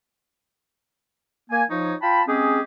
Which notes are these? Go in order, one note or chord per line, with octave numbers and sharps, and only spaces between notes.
A#3 G#5
F3 D#4 C#5
F4 G5 A5 B5
G#3 C4 C#4 G4 G#4